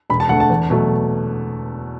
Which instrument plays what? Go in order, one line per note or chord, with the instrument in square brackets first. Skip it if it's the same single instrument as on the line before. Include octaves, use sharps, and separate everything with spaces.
[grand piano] E1 B5
A5
D2 D3 A3 F#5
A5
E2
B2 F#3 A3